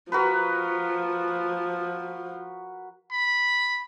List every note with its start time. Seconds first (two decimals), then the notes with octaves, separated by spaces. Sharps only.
0.12 F3 F#4 A#4 B4
3.12 B5